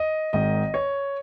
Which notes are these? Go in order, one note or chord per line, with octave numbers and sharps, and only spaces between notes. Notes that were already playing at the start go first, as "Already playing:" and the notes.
Already playing: D#5
G#1 G#2 D#3 D#5
C#5